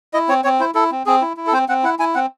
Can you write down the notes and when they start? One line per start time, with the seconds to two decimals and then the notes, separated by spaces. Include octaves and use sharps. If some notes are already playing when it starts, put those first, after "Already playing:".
0.14 E4 D#5
0.28 C4 C#5
0.44 C4 C#5
0.60 E4 C5
0.75 E4 A4
0.91 C4
1.06 C4 G#4
1.22 E4
1.37 E4
1.47 A4
1.52 C4 C5
1.69 C4 F#5
1.83 E4 F#5
1.99 E4 G#5
2.15 C4 F#5